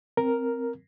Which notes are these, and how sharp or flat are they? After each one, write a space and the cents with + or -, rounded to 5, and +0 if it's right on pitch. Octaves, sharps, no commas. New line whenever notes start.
C4 +0 A#4 +0